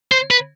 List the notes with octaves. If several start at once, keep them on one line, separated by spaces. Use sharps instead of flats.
C5
B4